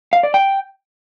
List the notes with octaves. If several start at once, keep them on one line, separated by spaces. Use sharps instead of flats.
F5
D5
G5